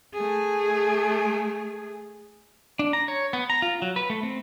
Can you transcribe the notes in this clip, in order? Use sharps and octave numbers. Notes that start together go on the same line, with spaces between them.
A3 G#4
D4
A#5
C#5
B3
A#5
F4
F#3
B4
A3
C4